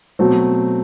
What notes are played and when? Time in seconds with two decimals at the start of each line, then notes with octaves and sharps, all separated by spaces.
0.19 B2 F#3 A3 C4